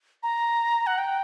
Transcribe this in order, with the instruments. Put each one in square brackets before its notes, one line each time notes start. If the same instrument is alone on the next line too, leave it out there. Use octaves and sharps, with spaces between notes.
[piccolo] A#5
F#5
G5